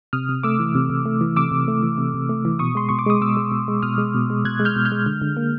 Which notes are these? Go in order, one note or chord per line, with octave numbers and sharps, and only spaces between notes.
C3 D#6 F6
C3
A3 D6 E6
E3
C3
C3
A3
E3
C3 D6 E6
C3
A3
E3
C3
C3
A3
E3
B2 C#6 D#6
G#3 C6
B2 C#6
D6
G#3 D#6
B2 D6 E6
G#3
B2
G#3
B2 D#6 F6
G#3
B2
G#3
B2 F#6 G#6
G#3
F6 G6
B2
F6 G6
G#3
D3
D3
A#3